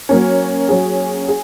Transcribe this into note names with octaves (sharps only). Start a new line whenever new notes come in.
F#3 A#3 C#4
F#3 C#4 G#4
G#4